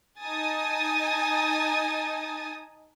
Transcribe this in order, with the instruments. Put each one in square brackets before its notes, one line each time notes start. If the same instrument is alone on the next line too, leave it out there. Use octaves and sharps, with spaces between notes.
[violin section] D#4 G#5 A5 D#6 A6